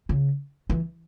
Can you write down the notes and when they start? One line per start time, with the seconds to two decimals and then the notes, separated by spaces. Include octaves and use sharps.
0.09 C#3
0.70 E3